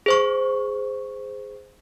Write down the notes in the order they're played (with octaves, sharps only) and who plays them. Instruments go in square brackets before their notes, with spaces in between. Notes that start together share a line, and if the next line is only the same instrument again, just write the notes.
[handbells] G#4 C5 C#6